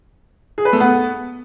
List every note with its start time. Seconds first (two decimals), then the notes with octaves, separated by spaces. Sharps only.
0.58 G#4
0.65 B4
0.73 A3
0.80 B3